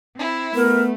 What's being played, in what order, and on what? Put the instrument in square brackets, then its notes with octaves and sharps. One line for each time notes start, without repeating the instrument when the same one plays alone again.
[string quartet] C4 E4
[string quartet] A3 [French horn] B3 [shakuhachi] A#4